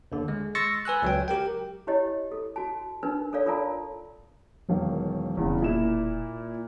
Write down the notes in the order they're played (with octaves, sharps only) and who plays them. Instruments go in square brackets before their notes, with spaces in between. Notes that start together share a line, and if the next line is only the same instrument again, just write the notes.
[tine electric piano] D#2 D3
G#3
C6 C#6 E6 A6 A#6 C#7
B4 G#5 E6 F#6
C#2 F#3 G5
G4 A#4 G5
[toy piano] E4 G4 C#5 D#5
A4
F#4 A5
D4 D#4 A#4 B4
A4 A#4 C#5 D5 F5
F4 A4 A#4 D5 A5 A#5
[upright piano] E1 D#3 F5 [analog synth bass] F#3
[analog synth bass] E1 [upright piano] E2 G2 C#3
[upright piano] A#2 E4 E7